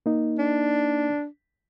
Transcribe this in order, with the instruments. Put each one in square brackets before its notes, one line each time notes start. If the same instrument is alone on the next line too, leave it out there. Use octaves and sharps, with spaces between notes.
[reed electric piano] A#3 D#4
[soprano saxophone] D4